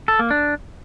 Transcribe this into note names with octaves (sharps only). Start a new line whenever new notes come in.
A4
A#3
D4